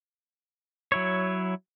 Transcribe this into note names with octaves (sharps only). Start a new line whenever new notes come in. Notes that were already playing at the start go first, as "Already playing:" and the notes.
F#3 E4 C#5